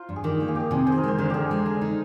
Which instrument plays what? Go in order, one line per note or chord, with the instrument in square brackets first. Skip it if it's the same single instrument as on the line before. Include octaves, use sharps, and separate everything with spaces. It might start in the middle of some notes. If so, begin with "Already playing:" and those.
Already playing: [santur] F4 A#4 C5
[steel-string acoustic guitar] G2
[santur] G#4
[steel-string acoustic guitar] D#3 [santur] G4
[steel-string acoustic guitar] A#3
[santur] G#4
[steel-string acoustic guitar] D#4 [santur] G4
[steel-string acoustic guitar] C3 [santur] G#4
[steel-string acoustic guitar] D#3 [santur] C5
[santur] G#4
A#4
[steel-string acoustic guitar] G#3 [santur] C5
[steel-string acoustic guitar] D3 [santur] A#4
[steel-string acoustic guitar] D3 [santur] G4 G#4
[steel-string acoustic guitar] G#3
D4
D#4